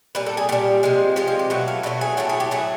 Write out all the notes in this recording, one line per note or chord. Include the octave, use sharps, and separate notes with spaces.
A#2 G3 B4
A4
G#4
A#2 G3 G4
C3 F3 G#3
C3 F3 G#3 F4
F4
G4
B2 F#3 A3 F#4
F4
B2 F#3 A3 D#4
G#4
A2 F#3 A3 G4
G#4
G4
A2 F#3 A3 G#4